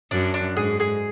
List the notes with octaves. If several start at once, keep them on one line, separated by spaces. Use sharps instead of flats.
F#2 D4
D4
G#2 G#4
G#4